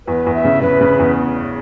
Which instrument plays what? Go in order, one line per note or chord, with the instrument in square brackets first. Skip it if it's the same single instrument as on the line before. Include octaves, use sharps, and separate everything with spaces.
[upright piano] E2 [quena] B4
[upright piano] E2
[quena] E5
[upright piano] C#3
[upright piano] C#3 [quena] B4
[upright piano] C#3
E2